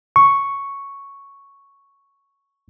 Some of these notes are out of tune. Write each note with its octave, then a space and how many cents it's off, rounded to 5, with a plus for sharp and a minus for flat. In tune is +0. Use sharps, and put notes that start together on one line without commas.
C#6 +0